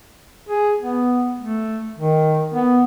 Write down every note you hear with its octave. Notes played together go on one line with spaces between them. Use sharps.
G#4
B3
A3
D#3
B3